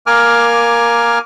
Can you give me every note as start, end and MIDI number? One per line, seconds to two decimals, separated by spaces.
0.07 1.19 58
0.07 1.19 70
0.07 1.19 80
0.07 1.19 86
0.07 1.19 89